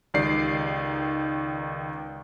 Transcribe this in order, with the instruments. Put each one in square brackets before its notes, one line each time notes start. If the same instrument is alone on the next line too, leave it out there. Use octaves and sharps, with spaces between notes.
[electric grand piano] C#2 D#3 G4 D5 C7